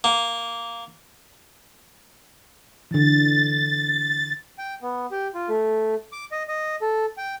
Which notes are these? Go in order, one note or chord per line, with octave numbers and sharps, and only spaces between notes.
A#3
D3 E3 A6
G5
B3
G4
F4
A3
D6
D#5
D#5
A4
G5